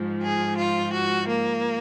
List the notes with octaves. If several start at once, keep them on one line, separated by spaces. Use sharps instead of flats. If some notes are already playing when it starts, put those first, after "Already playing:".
Already playing: G#2 F3
G#4
F4
F#4
A#3